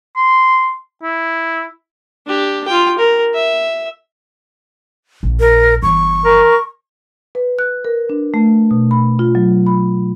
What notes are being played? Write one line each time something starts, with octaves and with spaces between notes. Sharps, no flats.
C6
E4
D4 G4
F4 G5
A#4
E5
A#1
A#4
G1 E3 C#6
A#4
B4
F#6
A#4
D4
A3
B2
B5
F4
F#3
B5